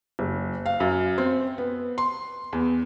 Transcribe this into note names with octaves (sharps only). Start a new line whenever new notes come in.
F#1
F5
F#2
C4
B3
C6
E2